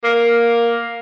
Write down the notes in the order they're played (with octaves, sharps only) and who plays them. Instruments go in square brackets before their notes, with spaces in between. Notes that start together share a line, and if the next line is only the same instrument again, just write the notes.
[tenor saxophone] A#3